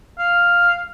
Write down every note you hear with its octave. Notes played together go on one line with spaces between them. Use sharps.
F5